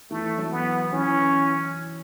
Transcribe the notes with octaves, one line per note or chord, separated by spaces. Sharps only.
E3 A3
F#3
B3
E3 C#4